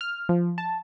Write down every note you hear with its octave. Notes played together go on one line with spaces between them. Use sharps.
F6
F3
A5